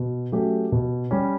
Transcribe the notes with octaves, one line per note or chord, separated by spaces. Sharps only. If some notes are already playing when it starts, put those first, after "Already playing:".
Already playing: B2
F#3 A3 C#4 G4
B2
G3 C#4